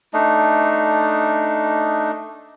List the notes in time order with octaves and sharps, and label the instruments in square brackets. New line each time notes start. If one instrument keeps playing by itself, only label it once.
[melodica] A3 D4 D#4